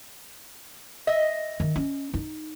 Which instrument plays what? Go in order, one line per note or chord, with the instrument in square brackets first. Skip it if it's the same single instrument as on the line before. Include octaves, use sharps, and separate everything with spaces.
[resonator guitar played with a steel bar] D#5 E5
[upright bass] D#3
C#4
D#4